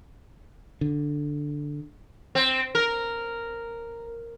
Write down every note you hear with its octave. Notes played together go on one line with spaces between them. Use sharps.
D3
C4
A#4